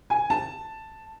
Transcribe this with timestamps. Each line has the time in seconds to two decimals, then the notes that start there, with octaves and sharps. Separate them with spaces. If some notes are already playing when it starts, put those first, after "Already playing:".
0.10 G#5
0.30 A5